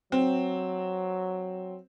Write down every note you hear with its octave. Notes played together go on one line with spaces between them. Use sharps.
F#3 C4